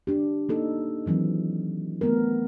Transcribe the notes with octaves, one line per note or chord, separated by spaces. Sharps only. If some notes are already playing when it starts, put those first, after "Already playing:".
D4 G4
A#3 D#4 A4
D#3 E3 F#3 C4
A3 B3 A#4